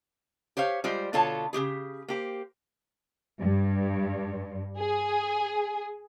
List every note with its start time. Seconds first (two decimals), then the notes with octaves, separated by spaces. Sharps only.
0.57 G4 C5 C#5 F5
0.84 G3 G#3 F4 C5 D5
1.13 B2 D3 F4 A4 C#5 A5
1.53 C#3 C4 G4 G#4
2.08 A#3 G4 C5
3.41 G2
4.77 G#4